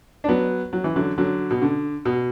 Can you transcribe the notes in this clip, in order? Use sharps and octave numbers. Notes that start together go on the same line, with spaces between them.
D4
F#3 B3
F#3
E3
D3 F#3
D3 F#3
B2
D3
B2